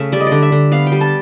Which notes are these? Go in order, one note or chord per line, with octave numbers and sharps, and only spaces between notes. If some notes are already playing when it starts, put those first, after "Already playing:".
Already playing: C#3 A3 E5
G3 D5
D#5
D3 D5
E5
D3
B3 F5
G5
G3
A5